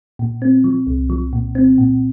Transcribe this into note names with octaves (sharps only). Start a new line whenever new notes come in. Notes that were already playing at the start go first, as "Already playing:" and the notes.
A#2
C4
F3
C2
F3
A#2
C4
A#2